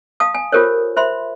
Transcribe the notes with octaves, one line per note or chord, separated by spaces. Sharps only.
F5 A5 D#6
G#5
F4 G4 A4 A#4 C5 C#5
C5 E5 B5 C6